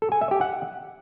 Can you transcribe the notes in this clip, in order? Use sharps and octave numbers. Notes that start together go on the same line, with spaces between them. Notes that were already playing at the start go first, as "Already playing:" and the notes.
A4
G#5
E5
G4
F#5